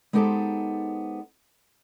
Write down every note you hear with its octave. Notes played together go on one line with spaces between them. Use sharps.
G#3 B3 D#4 G4 A4 C5